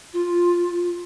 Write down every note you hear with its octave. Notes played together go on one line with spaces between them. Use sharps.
F4